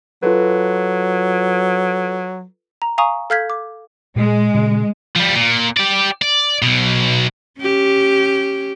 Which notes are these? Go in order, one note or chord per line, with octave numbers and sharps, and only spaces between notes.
F#3 F4 A4 B4
A#5
F5 G#5 A#5 C#6 D#6
A4 F5 F6 G6 G#6 B6
D6
A#2 G#3
A#2 C#3
F3 G3
A#2
G4 D5
D5
B1 B2
C#4 G4